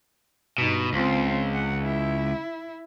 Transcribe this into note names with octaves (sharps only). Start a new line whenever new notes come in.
G2 B2 D#4
C#2 C4 F4
F#5
E4